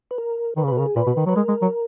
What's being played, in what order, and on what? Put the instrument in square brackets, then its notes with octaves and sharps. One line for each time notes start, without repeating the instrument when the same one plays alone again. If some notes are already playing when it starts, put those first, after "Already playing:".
[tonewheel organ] B4
A#4
[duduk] D#3 [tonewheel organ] B4
[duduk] C#3
[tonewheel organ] B4
[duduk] B2
[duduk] C#3 [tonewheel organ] A#4
[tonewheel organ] G#4
[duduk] A#2 [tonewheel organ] B4
[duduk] B2
D#3
F#3
[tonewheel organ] B4
[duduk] G#3 [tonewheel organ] A#4
[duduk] G#3
F#3